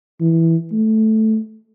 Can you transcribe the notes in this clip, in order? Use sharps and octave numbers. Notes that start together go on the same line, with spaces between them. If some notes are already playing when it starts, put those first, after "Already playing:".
E3
A3